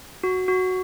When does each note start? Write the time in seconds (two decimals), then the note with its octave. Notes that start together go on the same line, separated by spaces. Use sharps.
0.23 F#4
0.48 F#4